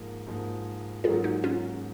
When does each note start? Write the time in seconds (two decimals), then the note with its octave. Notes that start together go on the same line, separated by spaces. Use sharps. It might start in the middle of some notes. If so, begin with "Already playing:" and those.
Already playing: G#2 F3 A#3
0.27 G#2 F3 A#3
1.04 G#2 D#3 F#3 A#3 C#4 F4 G#4
1.24 D#4 F#4
1.44 C#4 F4